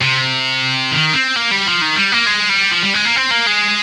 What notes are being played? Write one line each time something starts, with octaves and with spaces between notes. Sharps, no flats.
C3
D#3
C4
A#3
G3
F3
D#3
G3
A#3
G#3
G3
F3
G3
G#3
A#3
C4
A#3
G#3